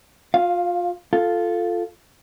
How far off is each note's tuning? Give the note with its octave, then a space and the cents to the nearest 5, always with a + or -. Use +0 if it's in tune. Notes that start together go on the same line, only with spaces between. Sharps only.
F4 +30 F5 +0
F4 +0 A4 +0